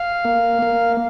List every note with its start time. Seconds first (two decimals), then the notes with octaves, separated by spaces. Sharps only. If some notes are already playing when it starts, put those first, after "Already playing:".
Already playing: F5
0.25 A#3
0.62 A#3